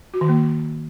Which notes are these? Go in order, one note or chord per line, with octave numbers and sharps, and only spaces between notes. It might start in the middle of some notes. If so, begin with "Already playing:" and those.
F#4
D#3
A#3